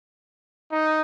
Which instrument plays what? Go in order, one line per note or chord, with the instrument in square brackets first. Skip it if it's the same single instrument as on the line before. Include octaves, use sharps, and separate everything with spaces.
[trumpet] D#4